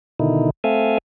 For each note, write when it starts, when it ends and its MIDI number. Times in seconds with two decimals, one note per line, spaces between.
0.20 0.50 47
0.20 0.50 50
0.20 0.50 51
0.20 0.50 63
0.20 0.50 64
0.64 0.98 57
0.64 0.98 60
0.64 0.98 69
0.64 0.98 76
0.64 0.98 77
0.64 0.98 80